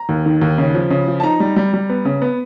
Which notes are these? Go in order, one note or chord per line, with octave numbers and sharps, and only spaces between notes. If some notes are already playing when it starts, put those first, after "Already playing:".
Already playing: A#5
D#2
D#3
D#2
C#3
F3
C#3
F3
A5
D#4 A#5
G3
G3
G3
B3
C#3
B3